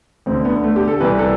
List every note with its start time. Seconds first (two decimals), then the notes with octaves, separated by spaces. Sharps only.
0.26 D2 C4
0.31 D3
0.45 B3
0.64 A3
0.76 G4
0.88 A4
1.00 C2 C3 E3 B4
1.19 A4